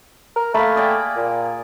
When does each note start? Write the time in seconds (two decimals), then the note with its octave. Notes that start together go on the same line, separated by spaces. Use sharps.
0.36 A#4
0.54 A3 A#3 B5
0.76 G#4 D5 G5
1.16 A#2